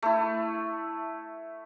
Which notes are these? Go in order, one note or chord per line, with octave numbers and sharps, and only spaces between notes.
A3 E4